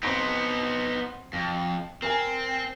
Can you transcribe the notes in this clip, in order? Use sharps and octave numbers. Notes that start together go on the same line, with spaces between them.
B3 C4 D#4 C6 D7
F2
C4 A#4 G#5